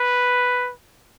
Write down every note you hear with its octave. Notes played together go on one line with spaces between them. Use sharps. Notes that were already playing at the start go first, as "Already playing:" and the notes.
Already playing: B4